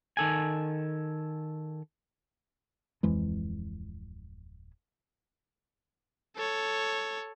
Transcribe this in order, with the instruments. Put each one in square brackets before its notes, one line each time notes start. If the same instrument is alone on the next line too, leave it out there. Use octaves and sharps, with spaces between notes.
[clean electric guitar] D#3 A4 G#5
[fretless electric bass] D1 F2 E3 G#3
[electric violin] A4 C#5